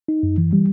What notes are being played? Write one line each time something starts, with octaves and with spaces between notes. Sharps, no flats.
D#4
F#2
E3
G3